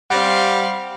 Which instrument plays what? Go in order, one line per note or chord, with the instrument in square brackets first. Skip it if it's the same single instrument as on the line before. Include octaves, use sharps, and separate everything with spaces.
[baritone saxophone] G3 [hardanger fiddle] C4 F5 [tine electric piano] F#5